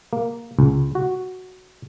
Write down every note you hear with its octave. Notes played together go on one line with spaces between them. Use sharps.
A#3
C#2
F#4